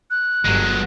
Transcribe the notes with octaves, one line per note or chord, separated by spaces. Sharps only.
F#6
G1 F#3 G#3